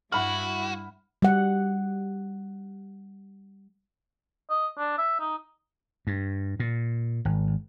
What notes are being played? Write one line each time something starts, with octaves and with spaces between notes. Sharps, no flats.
G2 E4 F#4 F#5 B5 F6
G3 F#5
D#5
D4
E5
D#4
G2
A#2
G#1